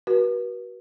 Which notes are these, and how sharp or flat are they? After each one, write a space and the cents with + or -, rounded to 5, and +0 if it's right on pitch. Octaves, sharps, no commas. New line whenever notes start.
F#4 +25 B4 -40